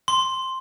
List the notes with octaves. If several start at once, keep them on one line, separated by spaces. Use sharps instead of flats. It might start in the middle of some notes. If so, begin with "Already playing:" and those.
C6